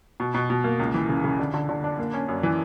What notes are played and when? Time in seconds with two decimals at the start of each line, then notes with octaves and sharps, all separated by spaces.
0.20 B2
0.34 B2
0.50 B2
0.64 A#3
0.79 C#2
0.94 E3
1.09 C#3
1.24 C#3
1.39 D3
1.54 D3
1.69 D3
1.84 D4
1.99 A#3
2.14 C#4
2.28 F#2
2.43 E3